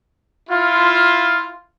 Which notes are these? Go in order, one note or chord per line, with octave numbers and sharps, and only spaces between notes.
E4 F4